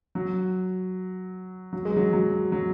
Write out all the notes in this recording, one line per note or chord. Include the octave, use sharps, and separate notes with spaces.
F#3
F#3
G#3
F#3
F#3
F#3